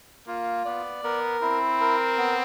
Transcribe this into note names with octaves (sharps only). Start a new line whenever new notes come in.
A#3 F4
B3 D5
B3 A#4
C4 E4
A#4
B3